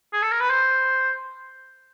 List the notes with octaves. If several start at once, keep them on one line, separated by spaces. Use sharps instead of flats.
G#4
A4
A#4
B4
C5